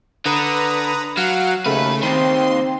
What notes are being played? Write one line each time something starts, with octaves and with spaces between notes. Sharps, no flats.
D3 B4 A#5 D#6
F#3 F5 F#5
D#2 C#3 A3 B4
D#2 D#3 C4 C6